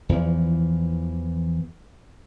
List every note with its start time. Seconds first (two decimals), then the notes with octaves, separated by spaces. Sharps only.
0.09 E2 E3 F3